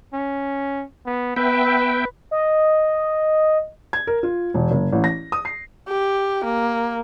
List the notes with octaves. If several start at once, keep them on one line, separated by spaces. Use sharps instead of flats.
C#4
B3
B3 B4 E5 G5
D#5
G#6
A#4
F4
E1
F#1
A1
A#6
D#6
C7
G4
A#3